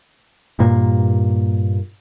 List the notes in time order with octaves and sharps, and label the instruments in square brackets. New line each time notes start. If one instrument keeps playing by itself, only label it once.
[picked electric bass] G2 A#2 A#3